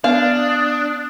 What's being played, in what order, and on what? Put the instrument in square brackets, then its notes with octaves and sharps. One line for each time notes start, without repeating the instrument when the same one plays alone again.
[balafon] B3 [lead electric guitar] D4 [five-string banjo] F5 [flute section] D#6 F#6